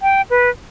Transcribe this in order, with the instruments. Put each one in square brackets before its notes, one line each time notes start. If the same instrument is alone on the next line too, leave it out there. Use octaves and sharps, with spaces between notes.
[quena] G5
B4